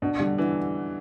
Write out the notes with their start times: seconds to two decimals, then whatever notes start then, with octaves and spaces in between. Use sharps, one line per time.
0.02 B2 D4
0.19 D3 G3
0.38 E3 D4